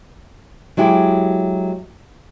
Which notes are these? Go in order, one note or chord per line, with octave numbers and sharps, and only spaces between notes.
F#3 G#3 E4 G4